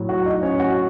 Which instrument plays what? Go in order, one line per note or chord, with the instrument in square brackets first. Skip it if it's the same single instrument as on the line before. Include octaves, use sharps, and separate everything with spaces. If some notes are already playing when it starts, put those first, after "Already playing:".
Already playing: [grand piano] A2 F#3
F#4 F#5
D#4 D#5
C#4 C#5
F#4 F#5